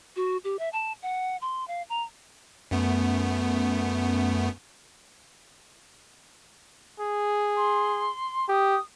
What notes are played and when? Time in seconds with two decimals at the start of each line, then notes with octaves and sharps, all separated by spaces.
0.16 F#4
0.44 G4
0.59 E5
0.73 A5
1.02 F#5
1.41 C6
1.67 F5
1.89 A#5
2.71 F#2 A3 B3
7.00 G#4
7.56 C6
8.49 G4 D#6